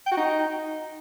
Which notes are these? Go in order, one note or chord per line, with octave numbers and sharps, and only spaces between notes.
G5
F#4
D#4